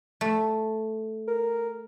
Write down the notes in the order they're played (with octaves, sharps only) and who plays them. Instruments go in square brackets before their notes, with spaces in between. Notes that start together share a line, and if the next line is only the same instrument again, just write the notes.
[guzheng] A3
[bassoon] A#4